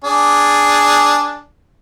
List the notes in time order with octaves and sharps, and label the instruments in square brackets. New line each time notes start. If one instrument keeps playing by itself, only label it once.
[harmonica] D4 G#4